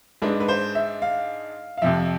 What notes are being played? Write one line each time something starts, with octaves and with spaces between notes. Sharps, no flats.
G#2 G#3 D4 B4
B4
C5
E5
F5
F5
F2 C3 F3 E5